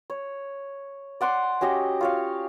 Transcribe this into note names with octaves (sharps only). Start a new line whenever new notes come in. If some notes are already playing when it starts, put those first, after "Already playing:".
C#5
D5 F#5 C6 D6
C#4 F#4 G4 D#5
F4 C#5 F5